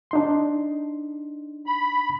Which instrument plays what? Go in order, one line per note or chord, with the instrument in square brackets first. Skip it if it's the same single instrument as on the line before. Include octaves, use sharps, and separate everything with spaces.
[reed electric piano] D4 D#4 C6
[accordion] B5